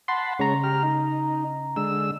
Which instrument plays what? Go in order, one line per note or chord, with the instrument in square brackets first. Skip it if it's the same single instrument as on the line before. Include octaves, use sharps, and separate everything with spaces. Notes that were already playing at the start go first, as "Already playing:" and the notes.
[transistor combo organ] F#5 A5 B5 [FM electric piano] C6
[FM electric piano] C#3 A#5 [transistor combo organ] G#3 C#5
[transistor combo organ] G4 F6
D#4
D3 G#3 E6